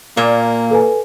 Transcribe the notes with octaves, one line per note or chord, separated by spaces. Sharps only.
A#2 A#3
A4 B4 G#5